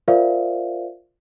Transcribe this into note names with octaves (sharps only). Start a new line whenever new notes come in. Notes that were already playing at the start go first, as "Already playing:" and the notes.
F4 A#4 C5 D5 E5 F5